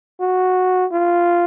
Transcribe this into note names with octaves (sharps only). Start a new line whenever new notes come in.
F#4
F4